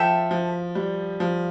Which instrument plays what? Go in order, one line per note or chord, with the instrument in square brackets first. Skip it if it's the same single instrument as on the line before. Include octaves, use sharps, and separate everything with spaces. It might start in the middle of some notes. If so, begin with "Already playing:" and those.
Already playing: [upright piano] F3 [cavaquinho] A4 E5 G5
[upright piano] F3
G3
F3